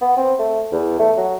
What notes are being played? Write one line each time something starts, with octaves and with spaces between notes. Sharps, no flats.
B3
C4
A3
E2
A3
F#3